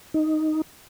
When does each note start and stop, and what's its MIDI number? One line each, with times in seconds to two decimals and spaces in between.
0.14 0.62 63